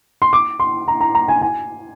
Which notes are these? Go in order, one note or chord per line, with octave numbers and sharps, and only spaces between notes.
C6
D6
C6
A#5
A#5
A#5
G#5
G#5